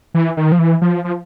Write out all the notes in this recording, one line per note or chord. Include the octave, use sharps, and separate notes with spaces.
E3
D#3
F3
E3
F3
F3